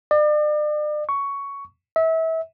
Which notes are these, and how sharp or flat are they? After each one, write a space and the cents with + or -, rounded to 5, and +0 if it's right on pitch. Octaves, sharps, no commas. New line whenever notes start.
D5 +40
C#6 +10
E5 -30